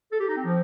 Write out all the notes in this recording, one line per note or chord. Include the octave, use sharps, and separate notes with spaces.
A4
G4
D#4
C4
F3